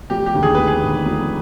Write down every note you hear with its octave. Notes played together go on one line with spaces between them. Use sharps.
F1 G4
G4
D#2 D3
G#4
F1 B4
G#4
D#2 D3
F1